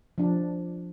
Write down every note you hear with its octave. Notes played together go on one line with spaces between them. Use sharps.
F3 D4